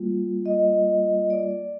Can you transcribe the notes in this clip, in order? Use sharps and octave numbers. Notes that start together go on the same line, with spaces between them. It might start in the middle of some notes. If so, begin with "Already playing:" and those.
Already playing: G3 A#3 F4
D#5
D5